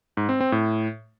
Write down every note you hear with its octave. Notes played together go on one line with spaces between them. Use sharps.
G#2
C4
C4
A2